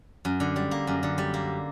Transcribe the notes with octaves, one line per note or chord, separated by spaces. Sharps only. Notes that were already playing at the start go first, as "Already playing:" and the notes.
F#2
D3
G3
A#3
F#2
D3
G3
A#3